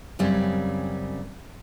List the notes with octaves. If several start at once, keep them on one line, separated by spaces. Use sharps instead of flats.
F#2 C#3 G3 C4 C#4